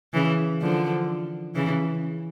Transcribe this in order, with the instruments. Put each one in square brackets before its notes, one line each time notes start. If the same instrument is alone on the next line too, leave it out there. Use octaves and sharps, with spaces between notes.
[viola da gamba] C#3 E3
D3 F3
C#3 E3